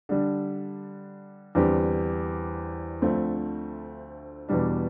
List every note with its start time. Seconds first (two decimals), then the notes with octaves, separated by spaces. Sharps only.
0.09 D3 G3 D4
1.55 E2 D3 G3 C4 G4
3.02 D2 D3 F3 A3 C4
4.49 E2 B2 G3 D4